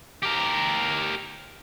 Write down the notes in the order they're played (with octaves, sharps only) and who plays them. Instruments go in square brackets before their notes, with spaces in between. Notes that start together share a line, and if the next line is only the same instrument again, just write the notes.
[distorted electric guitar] G4 A#4